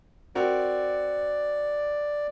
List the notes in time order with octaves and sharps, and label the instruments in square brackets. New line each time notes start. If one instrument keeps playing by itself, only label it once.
[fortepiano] C4 F#4 A#4 [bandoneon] D5